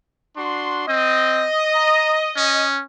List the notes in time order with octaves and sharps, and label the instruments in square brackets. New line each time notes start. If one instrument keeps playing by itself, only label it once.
[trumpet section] D4 F#4 C6
[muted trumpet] C4 [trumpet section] D#5
[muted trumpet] A#5
C#4